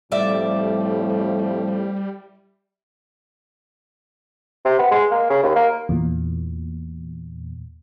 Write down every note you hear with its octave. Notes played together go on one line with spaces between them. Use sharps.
F2 A2 G3 D5 E5
C3
B3
G#3
A#3
C#3
D#2
A#3
E2 A#2